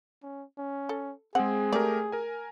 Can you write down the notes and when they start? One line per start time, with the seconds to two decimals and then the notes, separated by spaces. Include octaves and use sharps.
0.23 C#4
0.58 C#4
0.89 A4
1.35 G#3 C4 G#4 F#5
1.73 A3 G4 A#4 D5
2.12 A#4 G#5